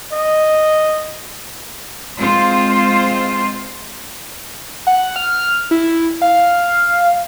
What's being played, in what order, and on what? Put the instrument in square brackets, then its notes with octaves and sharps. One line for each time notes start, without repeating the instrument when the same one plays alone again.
[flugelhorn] D#5
[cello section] G#3 C4 F4 C5
[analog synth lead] F#5
F6
E4
F5